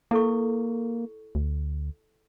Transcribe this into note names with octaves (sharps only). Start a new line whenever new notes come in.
A#3 E4 A4 C#6
D2